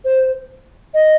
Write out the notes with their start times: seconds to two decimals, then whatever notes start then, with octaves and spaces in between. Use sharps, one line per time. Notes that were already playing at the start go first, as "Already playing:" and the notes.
0.05 C5
0.94 D#5